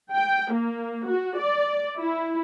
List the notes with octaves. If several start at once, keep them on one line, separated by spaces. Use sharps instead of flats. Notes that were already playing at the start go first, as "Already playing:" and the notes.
G5
A#3
F#4
D5
E4